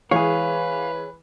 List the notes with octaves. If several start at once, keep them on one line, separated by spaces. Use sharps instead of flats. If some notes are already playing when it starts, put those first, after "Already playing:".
E3 G#3 G#4 B4 C#5 F5